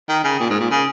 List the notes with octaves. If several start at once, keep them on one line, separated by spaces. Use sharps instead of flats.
D#3
C#3
A#2
G#2
A#2
C#3